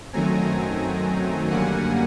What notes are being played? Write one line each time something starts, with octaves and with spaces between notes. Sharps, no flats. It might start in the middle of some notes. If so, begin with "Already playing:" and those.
F#2 D#3 F#3 A3 C4 G#5 A#5
F#2 D3 G3 A#3 F#5 G#5